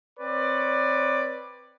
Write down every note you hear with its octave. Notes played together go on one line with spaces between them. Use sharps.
C4 B4 C#5 D5